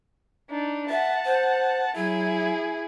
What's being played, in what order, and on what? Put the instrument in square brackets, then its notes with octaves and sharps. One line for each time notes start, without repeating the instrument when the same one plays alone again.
[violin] D4 D#4
[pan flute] E5 [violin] F#5 A5
[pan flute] C5
[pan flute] F#3 [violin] E4 G#4